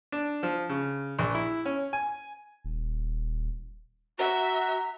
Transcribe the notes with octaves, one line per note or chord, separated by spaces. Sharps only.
D4
F3
C#3
A#1
E4
C#4
G#5
D#1
F#4 E5 A#5